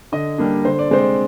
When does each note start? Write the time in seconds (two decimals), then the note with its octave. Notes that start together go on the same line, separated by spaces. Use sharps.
0.12 D3 D#5
0.38 G3 A#3 D4
0.65 D3 C5
0.79 D5
0.91 G#3 C4 C5